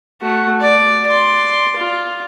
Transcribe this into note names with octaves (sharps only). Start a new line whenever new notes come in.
A3 F#4
D5
D5 C6
F4